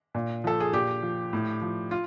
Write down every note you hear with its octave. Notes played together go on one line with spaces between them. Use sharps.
A#2
F3 A4
G#4
A#2 G4
F3
A2
F3
F4